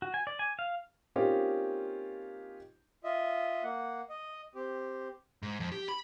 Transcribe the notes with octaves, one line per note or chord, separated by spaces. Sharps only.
F#4
G#5
D5
G#5
F5
A#3 C4 C#4 D#4 F4 G4
F4 D#5 E5
A#3 F#5
D#5
C4 G4
G#2
F2
G4
B5